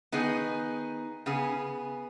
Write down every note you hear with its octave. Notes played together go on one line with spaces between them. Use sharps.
D#3 B3 D#4 G#4
C#3 B3 G#4